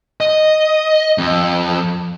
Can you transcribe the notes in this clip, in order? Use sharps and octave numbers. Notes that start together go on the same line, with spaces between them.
D#5
F2